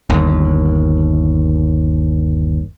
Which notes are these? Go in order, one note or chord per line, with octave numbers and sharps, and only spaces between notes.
G1 D#2